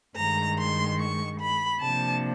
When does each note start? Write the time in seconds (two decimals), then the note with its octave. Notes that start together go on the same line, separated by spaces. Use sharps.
0.17 G2 D#3 G#3 A#5
0.58 C6
0.99 C#6
1.40 B5
1.81 C3 F3 A#3 D4 A5